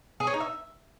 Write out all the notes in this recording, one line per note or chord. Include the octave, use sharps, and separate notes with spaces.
G#4
C#5
D#4
E5